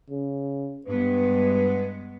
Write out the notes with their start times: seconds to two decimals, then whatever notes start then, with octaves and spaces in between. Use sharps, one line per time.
0.10 C#3
0.86 G2 G#3 B3 B4